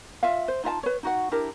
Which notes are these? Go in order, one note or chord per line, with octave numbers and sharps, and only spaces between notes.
F4 E5 F5
C5
D#4 F4 E5 A5
B4 C#5
D#4 F#4 F#5
D4 E4 G4 A#4